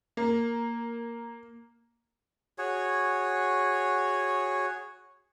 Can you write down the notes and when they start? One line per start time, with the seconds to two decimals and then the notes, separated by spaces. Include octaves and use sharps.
0.17 A#3
2.58 F#4 G#4 C#5